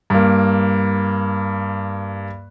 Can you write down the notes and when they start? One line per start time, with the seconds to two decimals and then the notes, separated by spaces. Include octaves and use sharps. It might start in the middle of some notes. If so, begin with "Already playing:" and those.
0.10 G2 A#3